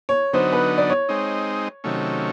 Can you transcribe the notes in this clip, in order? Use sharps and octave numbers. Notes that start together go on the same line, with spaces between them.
C#5
D3 F#3 B3 D#4 C5
B4
D5
C#5
G#3 C4 D#4
C3 D#3 F#3 A3 C#4